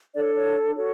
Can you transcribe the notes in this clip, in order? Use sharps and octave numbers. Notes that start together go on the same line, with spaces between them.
D4 A4 C#5 D5
C#5
F#4 A4 C#5